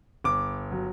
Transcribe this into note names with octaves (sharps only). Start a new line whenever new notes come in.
G1 D6
F#3